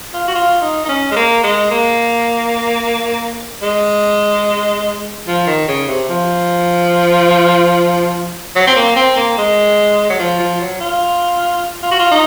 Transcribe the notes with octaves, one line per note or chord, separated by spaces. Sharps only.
F4
F#4
F4
D#4
D#4
C#4
G#3
A#3
G#3
A#3
G#3
F3
D#3
C#3
C3
F3
F#3
C4
A#3
C4
A#3
G#3
F#3
F3
F3
F#3
F4
F4
F#4
F4
D#4